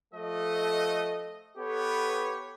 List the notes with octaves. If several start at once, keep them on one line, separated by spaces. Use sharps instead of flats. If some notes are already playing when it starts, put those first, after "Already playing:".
F3 A3 A4 D#5
B3 G4 A4 B4 C#5